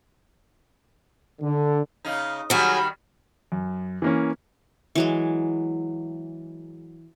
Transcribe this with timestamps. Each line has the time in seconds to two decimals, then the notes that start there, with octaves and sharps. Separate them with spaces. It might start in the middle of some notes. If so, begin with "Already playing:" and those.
1.41 D3
2.05 C#3 D#4
2.50 D#3 F#3 G3 F#4 G#4
3.52 F#2
4.02 E3 A#3 C#4
4.95 E3 F#3 G#3